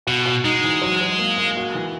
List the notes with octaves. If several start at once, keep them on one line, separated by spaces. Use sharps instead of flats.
B2 F#4
F#4
G#3 D#4
E3
F#3
F#3
A#3
A#3
F#4
E3